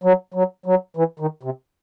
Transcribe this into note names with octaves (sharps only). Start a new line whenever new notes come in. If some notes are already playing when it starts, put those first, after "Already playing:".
F#3
F#3
F#3
E3
D#3
C3